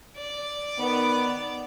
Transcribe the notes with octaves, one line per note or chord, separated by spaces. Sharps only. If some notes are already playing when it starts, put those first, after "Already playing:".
D5
D#3 B3